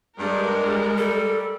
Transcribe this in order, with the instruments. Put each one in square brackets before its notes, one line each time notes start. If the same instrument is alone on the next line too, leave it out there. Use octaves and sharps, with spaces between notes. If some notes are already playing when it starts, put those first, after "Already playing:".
[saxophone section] G2 [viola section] G#3 A#4
[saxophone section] G3
[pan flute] A4